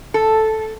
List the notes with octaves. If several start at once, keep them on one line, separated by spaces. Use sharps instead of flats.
A4